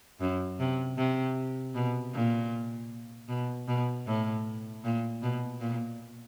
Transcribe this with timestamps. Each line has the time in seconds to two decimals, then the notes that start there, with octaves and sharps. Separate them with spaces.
0.21 F#2
0.59 C3
0.98 C3
1.75 B2
2.14 A#2
3.29 B2
3.68 B2
4.06 A2
4.84 A#2
5.22 B2
5.60 A#2